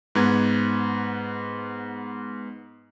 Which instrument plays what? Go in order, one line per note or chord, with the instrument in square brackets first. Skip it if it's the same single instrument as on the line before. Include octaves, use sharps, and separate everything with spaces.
[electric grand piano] G#2 B3 G#6